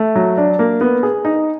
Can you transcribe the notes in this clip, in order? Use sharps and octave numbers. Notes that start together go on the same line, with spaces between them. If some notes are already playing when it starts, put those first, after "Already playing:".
Already playing: A3
F#3
D4
A#3
B3
G#4
D#4